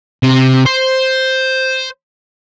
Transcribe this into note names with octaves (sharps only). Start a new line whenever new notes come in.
C3
C5